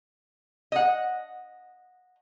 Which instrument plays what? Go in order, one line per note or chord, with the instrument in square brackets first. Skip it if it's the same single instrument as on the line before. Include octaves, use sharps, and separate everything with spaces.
[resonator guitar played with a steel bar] D#5 F#5